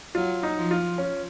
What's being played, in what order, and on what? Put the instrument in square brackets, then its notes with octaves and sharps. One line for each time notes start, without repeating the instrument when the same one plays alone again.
[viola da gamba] F#3 [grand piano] F4
[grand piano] D#4
[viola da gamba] F3
[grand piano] F4
[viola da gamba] F3 [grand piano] C#4